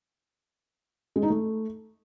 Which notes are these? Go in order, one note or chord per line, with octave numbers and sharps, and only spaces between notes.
G#3
D#4
A3